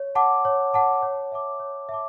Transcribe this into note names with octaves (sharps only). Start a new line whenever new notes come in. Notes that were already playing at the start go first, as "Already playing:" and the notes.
Already playing: C#5
F#5 A5 D6
C#5
F#5 A5 D6
C#5
E5 A5 D6
C#5
E5 A5 D6